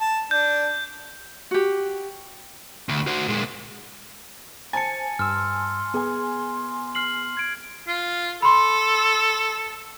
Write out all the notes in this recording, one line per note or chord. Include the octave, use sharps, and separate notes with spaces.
A5
D4 G6
F#4 G4
D2
F#4 C5
A#2 G#3
C5 G#5 A5 A6 C#7
G2 C6 E6 F6
B3 G#4 G#5
F6 C7 F#7
G#6 D7
F4
A4 B5 C6